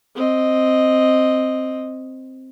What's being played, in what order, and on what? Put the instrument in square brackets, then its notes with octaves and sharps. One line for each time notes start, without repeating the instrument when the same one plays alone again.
[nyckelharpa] C4 D#5